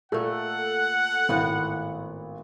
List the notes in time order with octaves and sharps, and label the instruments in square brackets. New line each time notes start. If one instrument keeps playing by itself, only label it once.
[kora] A#2 A3 [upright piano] A4 [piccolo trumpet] F#5
[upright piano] G#1 [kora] A2 B3